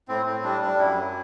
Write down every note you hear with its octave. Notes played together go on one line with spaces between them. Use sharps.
A2 C4
A2 C4
G3 D4
G3 D4
F#2 E4
F#3